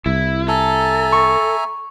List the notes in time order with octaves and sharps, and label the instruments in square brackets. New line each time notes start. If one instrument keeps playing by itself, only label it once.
[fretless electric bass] C2 [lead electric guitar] E4
[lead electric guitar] A4 [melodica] E5 G#5 A#5
[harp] C#6